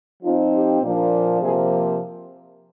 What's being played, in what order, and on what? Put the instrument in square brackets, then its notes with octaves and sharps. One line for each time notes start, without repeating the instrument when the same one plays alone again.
[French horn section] F3 C4 D#4 F4
G4
A#2 F3 A#3 D4
C3 F3 A#3 G#4